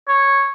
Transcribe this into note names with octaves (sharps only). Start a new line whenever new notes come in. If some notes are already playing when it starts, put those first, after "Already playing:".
C#5